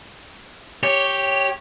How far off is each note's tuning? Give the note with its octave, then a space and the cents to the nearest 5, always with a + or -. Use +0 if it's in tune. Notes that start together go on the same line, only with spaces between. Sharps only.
G4 +0 C#5 +0